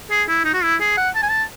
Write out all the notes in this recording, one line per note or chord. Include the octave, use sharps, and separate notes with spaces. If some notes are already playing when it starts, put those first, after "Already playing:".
G#4
E4
D#4
F#4
E4
G#4
F#5
A5
G#5
A5